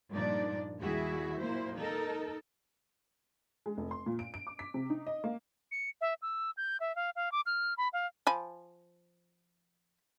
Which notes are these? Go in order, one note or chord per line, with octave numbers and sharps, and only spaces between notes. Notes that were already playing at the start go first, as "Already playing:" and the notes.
G2 A#2 F3 D4 D#4 D5
D#2 G3 E4 F#4 G#4 E5
A#2 F#3 A#3 E4 C5
D#4 A4 A#4
G#3
F1
C6
A#2
D7
D7
D6
B6
C3
D#4
D#5
A#3
C#7
E5
E6
G6
E5
F5
F5
D6
F6
B5
F5
F3 G#5 B5